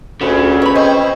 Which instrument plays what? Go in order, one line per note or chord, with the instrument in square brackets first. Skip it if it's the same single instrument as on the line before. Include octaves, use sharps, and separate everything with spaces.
[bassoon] D2 [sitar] A#2 C#4 [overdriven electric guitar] C#3
[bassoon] B3 [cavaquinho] C#5 B5
[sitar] C4 C#4 C5 [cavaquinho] D#5 C#6